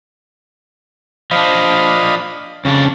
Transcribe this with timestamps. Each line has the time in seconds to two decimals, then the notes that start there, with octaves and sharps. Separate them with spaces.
1.31 F3 D4 D#5 F5 B5
2.65 F2 C#3 D4